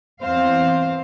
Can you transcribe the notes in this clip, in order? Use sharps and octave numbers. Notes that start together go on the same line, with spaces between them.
E2 C4 C5 F5